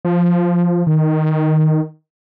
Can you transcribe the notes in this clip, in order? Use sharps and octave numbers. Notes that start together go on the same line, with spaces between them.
F3
D#3